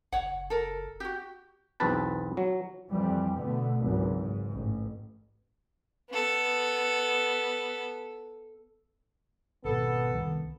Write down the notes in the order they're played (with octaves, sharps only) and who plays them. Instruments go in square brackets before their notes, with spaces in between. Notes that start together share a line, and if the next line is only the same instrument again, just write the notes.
[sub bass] F#1 [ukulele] C#5 F#5
[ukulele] A4 A#4
F#4 G4
[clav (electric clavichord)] B1 E2 C4 B4 A5
F#3
[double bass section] F2 E3 G3
B2 D3 A3 B3
G#1 C#2 E3 F#3
G#2
A1
[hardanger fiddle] B3 A4
[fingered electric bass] G#1 B2 [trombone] B3 [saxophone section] A4
[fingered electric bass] C2 D#3